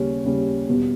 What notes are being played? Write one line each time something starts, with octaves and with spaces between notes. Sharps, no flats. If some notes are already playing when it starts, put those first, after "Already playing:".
Already playing: D#2 C#3 G3 C#4
D#2 C#3 G3 C#4
E2 B2 G3